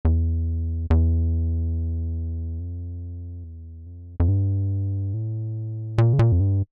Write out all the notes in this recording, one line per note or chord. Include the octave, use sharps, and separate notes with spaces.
E2
E2
F2
E2
F2
F2
G2
A2
A#2
C#3
A#2
F2
G2